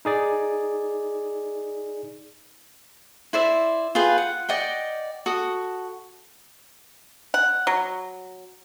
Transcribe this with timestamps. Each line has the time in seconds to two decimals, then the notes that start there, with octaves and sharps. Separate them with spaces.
0.05 D#4 G#4 D5
3.33 E4 C5 D5 E5
3.95 F4 G#4 B4 G5
4.18 F#5
4.49 D5 D#5 F#5 G5
5.26 F#4 A4 D#6
7.34 F#5
7.67 F#3